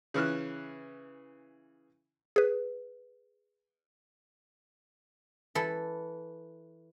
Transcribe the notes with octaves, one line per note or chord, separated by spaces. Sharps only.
C#3 E3 F6 F#6
G#4 B4
E3 A4